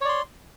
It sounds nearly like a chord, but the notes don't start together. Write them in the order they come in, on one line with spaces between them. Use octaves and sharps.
C#5 D5 C6